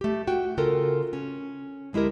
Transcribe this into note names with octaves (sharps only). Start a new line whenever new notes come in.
A3 G4
F#4 G5
C#3 F4 A4 A#4
C#4
D2 G#3 E4 G4 A#4